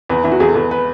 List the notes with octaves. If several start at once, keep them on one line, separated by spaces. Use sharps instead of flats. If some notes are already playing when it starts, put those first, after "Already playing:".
E2 B4
E2 E4
F#4
E2 G#4
A4
E2 B4
B4